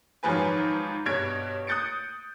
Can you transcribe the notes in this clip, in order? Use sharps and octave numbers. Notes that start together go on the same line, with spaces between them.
G#2 D#3 F3 F#3 B4 G#5
G2 B2 C#5 G#6 D7
D#6 F#6 G6 A6 C#7 D7